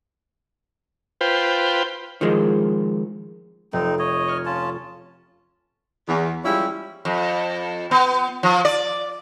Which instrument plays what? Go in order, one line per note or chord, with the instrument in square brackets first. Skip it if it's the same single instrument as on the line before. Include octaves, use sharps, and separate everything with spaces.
[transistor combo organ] F4 B4 C5 G5
[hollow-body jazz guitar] D#3 F3 G#3
[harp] F1 [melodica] C4 D#4
[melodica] C#5 D#5
[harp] C#6 F6
[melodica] C#4 F4 A5
[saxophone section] E2
F3 G3 G#3 C#4 E4
[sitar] F2
B3
F3
D5